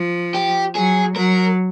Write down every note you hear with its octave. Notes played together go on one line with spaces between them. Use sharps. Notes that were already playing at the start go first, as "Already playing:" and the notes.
Already playing: F3
G4
F#3 G#4
F#3 A#4